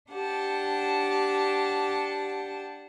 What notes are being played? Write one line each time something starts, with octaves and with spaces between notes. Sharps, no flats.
D4 G4 F#5 A5